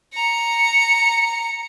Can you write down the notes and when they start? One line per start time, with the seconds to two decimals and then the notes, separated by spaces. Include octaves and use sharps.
0.14 A#5 C#7